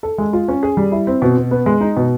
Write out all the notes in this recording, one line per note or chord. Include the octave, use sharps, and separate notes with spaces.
A4
G#3
F4
C#4
G#4
G3
E4
C4
B2
B2
B3
G#3
D#4
B2